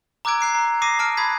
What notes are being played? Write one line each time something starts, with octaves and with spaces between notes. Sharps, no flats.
A#5 D6 E6 F#6 G#6 D7
F#6 C7 D7
A#5
D6 D#6 A#6 C7 D#7
A5 F6 D7
B5 D#6 F#6 G#6 B6